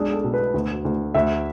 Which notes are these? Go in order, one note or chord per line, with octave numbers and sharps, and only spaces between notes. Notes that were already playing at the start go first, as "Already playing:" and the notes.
Already playing: B1 G#3 D4 G#4
A4
B2
B4
D2
D2
D2 E5